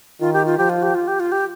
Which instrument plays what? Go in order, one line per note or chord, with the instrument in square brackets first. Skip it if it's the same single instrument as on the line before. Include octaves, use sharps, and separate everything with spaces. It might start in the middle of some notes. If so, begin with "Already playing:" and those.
[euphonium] D#3 [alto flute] F4
[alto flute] G4
F4
[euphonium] F3 [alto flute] G4
[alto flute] F4
G4
F4
G4
F4
G4